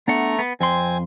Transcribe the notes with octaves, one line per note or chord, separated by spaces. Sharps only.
A3 B3 D4 F#5 A#5
B3
F2 C4 G#5 C6